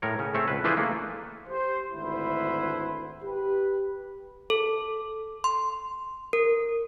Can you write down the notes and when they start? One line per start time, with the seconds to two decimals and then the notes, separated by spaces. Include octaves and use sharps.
0.02 A2 A#4 C#5
0.19 C#3 C#4
0.34 A3 C4 C#5 E5
0.48 C#2 B4
0.64 E3 F3 D4 G#4 B4 C5
0.77 A3 A#3
1.49 G4 C5
1.90 G#1 D2 E4 B4 C5
3.23 G4 B4
4.50 A4
5.44 C6
6.33 A#4